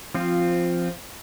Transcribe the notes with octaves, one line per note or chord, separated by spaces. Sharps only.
F3 C4 F4